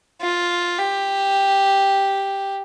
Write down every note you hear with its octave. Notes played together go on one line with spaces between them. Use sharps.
F4
G4